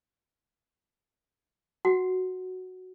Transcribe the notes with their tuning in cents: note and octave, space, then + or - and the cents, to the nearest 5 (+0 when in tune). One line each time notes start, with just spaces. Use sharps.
F#4 +0 F#5 +10